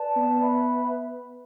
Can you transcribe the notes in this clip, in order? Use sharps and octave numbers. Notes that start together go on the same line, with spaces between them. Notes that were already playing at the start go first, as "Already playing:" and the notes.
Already playing: B4 D5 A5
B3
B4 E5 B5